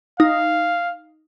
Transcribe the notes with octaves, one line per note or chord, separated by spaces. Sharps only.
D#4 F5